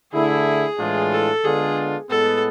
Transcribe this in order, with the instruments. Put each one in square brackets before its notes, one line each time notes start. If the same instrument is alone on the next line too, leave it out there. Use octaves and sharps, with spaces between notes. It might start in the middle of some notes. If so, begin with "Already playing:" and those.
[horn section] D3 A3 E4 [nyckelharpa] G#4
[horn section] A2 E3 G#3 D4 F4
[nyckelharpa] A4
[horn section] D3 G#3 B3 D4 F4 [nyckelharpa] G#4
[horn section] A2 G#3 B3 [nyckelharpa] A4